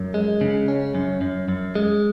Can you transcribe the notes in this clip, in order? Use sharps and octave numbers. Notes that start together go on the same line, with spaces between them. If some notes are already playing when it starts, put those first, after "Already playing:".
Already playing: F#2
G#3
C#3
C#4
F#2
F#2
F#2
G#3